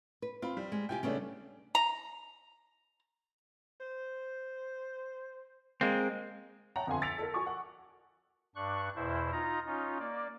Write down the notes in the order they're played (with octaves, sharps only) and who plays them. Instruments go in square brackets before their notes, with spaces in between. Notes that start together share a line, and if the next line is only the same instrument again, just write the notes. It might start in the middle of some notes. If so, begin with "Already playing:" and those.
[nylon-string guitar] B4
[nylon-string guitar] C4 [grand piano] F4 B5
[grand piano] G3
[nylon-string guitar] G#3
[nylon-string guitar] C3 F4 G4 [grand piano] G5 G#5
[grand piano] C#3 A3 D4 [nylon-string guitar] G3 B3 C#4
[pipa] A#5
[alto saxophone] C5
[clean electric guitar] G#3 C4 [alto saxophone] A#3
[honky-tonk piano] C#5 E5 F#5 G5 A5 A#5
G1 F2 F4 F#5 G#5 C6
E6 A6 B6 C#7 D7 F7
A4 A#4
F#4 G#5 C#6 D6
F#5
[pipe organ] G2 D4 C#6 F#6
E2 B2 E4 C5
D#4 F4 A#5
C#4 D#4 F4
A#3 D5